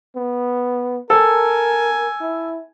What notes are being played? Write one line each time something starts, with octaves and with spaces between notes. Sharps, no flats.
B3
A4 A#4 G#5
E4